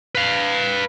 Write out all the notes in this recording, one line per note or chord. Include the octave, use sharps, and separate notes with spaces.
B4 F5